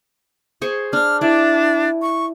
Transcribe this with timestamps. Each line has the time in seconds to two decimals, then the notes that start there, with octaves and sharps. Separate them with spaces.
0.61 G#4 C5 C#6
0.93 D4 F6
1.21 D4 E4 D5
2.02 C#6